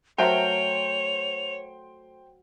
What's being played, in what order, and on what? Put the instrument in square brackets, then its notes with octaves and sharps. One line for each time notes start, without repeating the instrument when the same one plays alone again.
[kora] F#3 A3 A#4 [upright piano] C5 G5 [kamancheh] C#5 [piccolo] F7